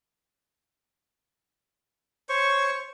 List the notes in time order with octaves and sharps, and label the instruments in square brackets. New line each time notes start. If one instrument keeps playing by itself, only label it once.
[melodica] C5 C#5 C#6